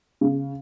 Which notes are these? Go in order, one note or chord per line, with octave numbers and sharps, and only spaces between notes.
C#3